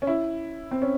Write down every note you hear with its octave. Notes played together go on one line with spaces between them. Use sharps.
C#4
E4
C4
C#4